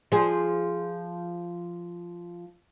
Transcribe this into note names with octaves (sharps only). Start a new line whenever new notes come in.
F3 G#4